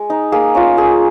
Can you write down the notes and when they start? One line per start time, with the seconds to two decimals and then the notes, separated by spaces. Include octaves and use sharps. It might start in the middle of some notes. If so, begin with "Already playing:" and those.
Already playing: G#3
0.10 D#4
0.32 A#3 G#4
0.55 C#4 F4
0.77 A#3 G#4